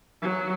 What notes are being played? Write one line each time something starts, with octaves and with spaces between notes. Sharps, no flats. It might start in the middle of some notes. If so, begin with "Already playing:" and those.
F#3